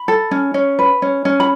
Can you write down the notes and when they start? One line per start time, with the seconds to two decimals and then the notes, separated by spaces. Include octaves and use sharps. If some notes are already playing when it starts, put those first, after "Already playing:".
Already playing: B5
0.08 A4
0.31 C#4
0.54 C#4
0.79 B4
1.02 C#4
1.25 C#4
1.40 B5